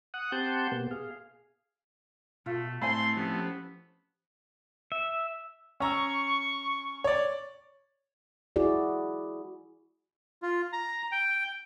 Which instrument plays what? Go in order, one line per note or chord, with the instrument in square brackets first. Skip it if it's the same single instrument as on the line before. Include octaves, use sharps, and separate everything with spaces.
[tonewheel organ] F#5 D#6 F#6
C4 G4 F#5 A5 C6 G6
B2 A#3 B3 G4
G#4 F5
[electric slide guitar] B2 A5 [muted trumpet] A3 [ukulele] F4 A4
[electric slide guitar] A2 [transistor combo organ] A3 C4 E4 [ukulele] C5 G#5 B5 [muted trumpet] C6
[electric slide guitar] F3 C#4 G4 [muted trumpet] B3
[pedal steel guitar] E5
[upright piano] C#4 A#5 E6 [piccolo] C#6
[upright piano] C#5 D5
[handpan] E4 F#4 G#4 D5
[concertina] F4
A#5
G5